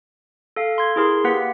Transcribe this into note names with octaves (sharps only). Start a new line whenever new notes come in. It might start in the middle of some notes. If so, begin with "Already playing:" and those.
A4 F5
C6 G#6
E4 G#4 A#4 C6
A#3 G4 B4 F#5 B6